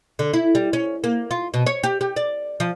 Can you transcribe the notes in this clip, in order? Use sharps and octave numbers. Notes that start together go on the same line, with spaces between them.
D3
E4
G3
C#4
A#3
F4
B2
C#5
G4
G4
D5
F3